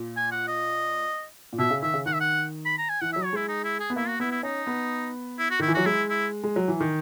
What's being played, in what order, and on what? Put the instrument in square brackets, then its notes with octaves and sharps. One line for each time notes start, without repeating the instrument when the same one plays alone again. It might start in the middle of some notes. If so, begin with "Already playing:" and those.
Already playing: [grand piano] A#2
[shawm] G#5
F#5
D#5
[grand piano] A#2
[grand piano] B2 [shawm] E5
[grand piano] C#3
[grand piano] D#3 [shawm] E5
[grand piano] C#3
[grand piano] D#3 [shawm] F#5
[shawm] E5
F#5
B5
A#5
G#5
[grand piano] E3 [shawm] F#5
[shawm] E5
[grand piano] F#3
[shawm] C#5
[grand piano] G#3 [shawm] E4
[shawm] D#4
E4
G#4
[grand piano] B3
[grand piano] A#3 [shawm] E4
[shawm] F#4
[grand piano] B3 [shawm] E4
[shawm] E4
[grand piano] C#4 [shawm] D#4
[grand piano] B3
[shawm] E4
F#4
[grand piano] D#3 [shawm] E4
[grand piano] E3
[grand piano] F#3 [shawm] F#4
[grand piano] G#3 [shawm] E4
[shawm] E4
[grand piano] G#3
F#3
E3
D#3